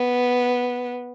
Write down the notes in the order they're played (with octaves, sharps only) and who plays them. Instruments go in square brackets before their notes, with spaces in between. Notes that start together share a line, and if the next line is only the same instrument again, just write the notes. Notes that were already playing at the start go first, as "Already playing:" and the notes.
Already playing: [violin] B3